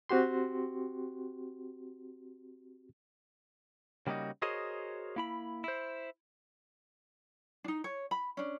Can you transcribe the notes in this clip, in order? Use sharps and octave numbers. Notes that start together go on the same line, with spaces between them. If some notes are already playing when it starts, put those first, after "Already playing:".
C4 F#4 G4 C6
C#3 G3 A#3 C#4 D#4 F#4
F#4 G#4 A#4 C5 C#5 D#5
A#3 E4 B5
E4 C5
D4 D#4
C#5
B5
C#4 D4